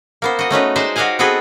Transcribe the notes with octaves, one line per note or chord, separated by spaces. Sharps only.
A#3 B3 C5
F#4 D#5
A3 C#4 D#4 B4
G#3 D#4 C5 D5 E5
F#4 G4 D#5 F5 F#5 G#5
B3 C4 F#4 G#4 A4 B4